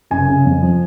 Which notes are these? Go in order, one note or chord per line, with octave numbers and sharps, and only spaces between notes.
F#1 G#5
C#3
F2
F3